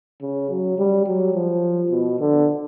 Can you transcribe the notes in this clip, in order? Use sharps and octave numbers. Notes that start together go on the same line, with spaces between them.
C#3
F#3
G3
F#3
F3
B2
D3